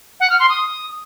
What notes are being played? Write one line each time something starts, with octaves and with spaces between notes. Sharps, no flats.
F#5
F6
C6
D#6